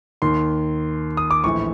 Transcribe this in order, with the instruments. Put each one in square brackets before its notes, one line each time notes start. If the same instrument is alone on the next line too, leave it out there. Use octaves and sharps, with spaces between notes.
[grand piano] D#2 D#3 C6
D#6
D6
A#1 A2 E3 C#6